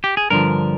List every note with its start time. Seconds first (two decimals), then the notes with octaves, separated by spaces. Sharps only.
0.04 G4
0.17 G#4
0.30 G2 D3 F3 A#4